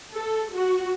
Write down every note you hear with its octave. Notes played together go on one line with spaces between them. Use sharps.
A4
F#4